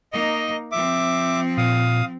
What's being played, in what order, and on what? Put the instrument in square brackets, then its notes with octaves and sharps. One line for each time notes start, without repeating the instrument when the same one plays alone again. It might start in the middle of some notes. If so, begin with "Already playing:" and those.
[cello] A#3 D#4 [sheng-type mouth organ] D#5
[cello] F3 C4 [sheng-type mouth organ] E5 D6
[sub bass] A#2 [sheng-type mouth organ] F5 D#6